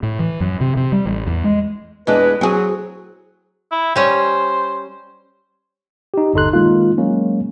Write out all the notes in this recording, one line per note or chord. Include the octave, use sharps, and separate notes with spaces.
A2
E3
F#2
C3
C3
G3
A1
E2
G#3
E2 G#3 D4 B4
F#3 C4 G#4
E4
G3 C#4 C5
D#4 G4
G1 D#2 D#4 A4 C6 F#6
D#3 G#3 A#3 D#4 F4
F#3 G#3 A#3 C#4